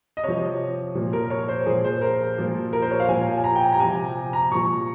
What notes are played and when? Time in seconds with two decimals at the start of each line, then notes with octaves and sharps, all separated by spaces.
0.17 D#5
0.23 C3 F3 C#5
0.95 A#2 F3
1.13 A#4
1.30 C#5
1.49 C5
1.66 A#2 F3 G#4
1.85 C5
2.01 A#4
2.38 A#2 F3
2.73 A#4
2.82 C5
2.91 C#5
3.00 F5
3.08 A#2 F3 G#5
3.38 G#5
3.44 A#5
3.56 G5
3.62 G#5
3.72 A#5
3.80 C3 F3 G#5
4.33 A#5
4.51 A#2 F3 C#6